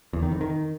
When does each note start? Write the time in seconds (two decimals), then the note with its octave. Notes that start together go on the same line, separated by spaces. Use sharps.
0.13 E2
0.23 D#3
0.32 F2
0.41 D#3